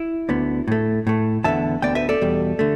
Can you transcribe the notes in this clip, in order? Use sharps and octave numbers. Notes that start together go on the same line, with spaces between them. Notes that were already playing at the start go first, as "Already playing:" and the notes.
Already playing: E4
D2 D3 B3
A2 A3
A2 A3
E2 D3 B3 E5 A5
D2 D3 B3 D5 G5
B4 E5
A4 D5
E2 B2 G3
D3 A3